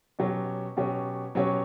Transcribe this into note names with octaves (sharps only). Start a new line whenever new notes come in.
B2 F#3 C#4 G4 C#5
B2 F#3 C#4 G4 C#5
B2 F#3 C#4 G4 C#5